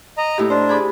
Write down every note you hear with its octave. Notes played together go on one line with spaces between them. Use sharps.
D#5 A#5
A2 E4 G4
D4 C5
G#4 B5 D6